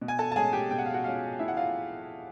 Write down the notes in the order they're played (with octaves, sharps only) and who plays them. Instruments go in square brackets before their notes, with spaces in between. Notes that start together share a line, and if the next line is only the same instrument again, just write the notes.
[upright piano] B2
G#5
A4 A5
A5
G#3 C#4 G#4 G#5
G4 G5
B2 G5
F#5
F5
F#4 F#5
G#3 C#4 F4 F5
B2 E4 E5
F#5
F4 F5